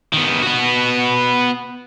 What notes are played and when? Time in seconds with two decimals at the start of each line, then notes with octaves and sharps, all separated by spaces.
0.13 D#3 B3
0.42 B3 F#4